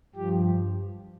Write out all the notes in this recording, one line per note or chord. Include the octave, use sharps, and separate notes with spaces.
G2 F3 G4